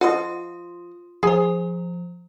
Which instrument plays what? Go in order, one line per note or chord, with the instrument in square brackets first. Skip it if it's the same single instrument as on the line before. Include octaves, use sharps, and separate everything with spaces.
[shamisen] F3 D#5 F#5 [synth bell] F4 C6 D#6
[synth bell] F3 C5 [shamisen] G#4 G#5